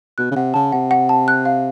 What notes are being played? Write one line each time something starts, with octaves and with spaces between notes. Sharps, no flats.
B2 F#6
C#3
C3 F#5
C#3 A5
C3 F#5
F#5
A5
F#6
F5